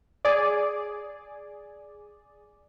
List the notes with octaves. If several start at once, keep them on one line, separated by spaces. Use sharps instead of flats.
G#4 D5